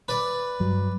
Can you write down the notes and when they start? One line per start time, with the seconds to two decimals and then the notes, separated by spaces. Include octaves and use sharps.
0.08 B4 D5
0.60 G2 F#3